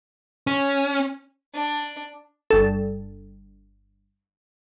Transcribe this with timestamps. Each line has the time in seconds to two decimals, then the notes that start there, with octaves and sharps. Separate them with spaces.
0.47 C#4
1.54 D4
2.51 G1 A4